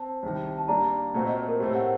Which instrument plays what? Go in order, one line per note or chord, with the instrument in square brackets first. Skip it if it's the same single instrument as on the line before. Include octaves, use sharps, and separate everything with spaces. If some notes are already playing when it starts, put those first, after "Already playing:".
Already playing: [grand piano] C4 [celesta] A5
[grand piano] C2 C3 D#3
[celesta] A5
[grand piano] G3 A#3 D4 [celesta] A#5
[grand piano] A#2 A3 C4 F#4 [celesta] A#5
[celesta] D#5
C5
A#4
[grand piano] A2 A3 C4 [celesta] G4
[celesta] F#5